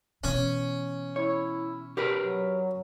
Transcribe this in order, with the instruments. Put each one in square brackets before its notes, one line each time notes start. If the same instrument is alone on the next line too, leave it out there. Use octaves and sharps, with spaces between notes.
[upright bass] B2 E3 [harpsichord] C#4
[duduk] E4 [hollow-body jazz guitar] C#5
[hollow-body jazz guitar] G4 A#4 B4
[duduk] F#3